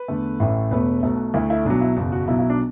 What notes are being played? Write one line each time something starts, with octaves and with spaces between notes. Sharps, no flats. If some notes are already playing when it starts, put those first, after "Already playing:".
Already playing: B4
E2 D3 A3
A1 A2 E3 A3
E1 E2 B2 A3 B4
B1 B2 A3
D2 D3 A3 E4
E4
B1 B2 F#3 D4
E4
F#1 E2 B2
F#4
B1 B2 F#3 E4
E4
D4